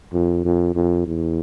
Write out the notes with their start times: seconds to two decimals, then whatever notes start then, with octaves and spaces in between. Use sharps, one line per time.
0.13 F2
0.45 F2
0.75 F2
1.06 E2